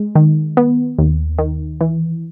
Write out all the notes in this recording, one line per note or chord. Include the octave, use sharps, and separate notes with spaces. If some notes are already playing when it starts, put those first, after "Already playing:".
Already playing: G#3
D#3
B3
D#2
D#3
E3